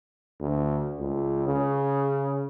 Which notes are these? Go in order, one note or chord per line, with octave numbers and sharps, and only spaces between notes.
D2
C#2
C#3